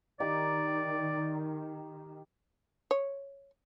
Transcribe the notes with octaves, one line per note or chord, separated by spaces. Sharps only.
D#3 D#4 G4 D5 G5
C#5